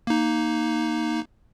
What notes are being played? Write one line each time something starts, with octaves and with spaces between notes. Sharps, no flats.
A#3 D#4